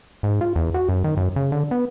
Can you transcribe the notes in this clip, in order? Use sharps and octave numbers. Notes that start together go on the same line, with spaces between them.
G#2
F4
E2
F#4
F#2
D#3
F#2
C#3
D3
B3